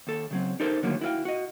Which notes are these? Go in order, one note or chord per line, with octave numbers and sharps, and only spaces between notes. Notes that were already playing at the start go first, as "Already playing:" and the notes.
D#2 A4
C#3 F#3 C4
D#4 G4 A4 A#4 C5
D#2 A2 D3 F#3 A#3
E4 F#4 G#4 F5 G5
F#4 D#5